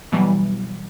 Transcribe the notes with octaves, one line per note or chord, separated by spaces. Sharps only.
B2 E3 F#3 G3